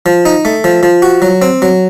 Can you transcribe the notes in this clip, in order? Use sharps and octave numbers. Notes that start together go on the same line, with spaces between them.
F3
D#4
A3
F3
F3
F#4
F#3
C4
F#3